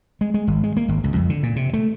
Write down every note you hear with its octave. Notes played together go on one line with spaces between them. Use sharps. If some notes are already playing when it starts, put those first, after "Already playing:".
G#3
G#3
G#1
G#3
A#3
G#1
C#2
F2
D3
A#2
C3
A3